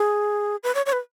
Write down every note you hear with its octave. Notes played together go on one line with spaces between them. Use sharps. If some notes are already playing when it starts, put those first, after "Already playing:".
Already playing: G#4
B4
C#5
C#5
B4